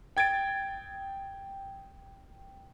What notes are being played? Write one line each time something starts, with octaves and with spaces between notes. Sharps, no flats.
G5 G#6 A6 D7